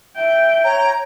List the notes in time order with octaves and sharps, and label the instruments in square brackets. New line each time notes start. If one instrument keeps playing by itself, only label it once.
[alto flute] E5 [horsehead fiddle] G5
[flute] C#5 [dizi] A#5